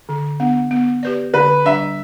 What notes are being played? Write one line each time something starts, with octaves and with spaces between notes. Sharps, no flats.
D3
B3 D4
B3
G4 B4 D5
D3 B4
G3 D4 E5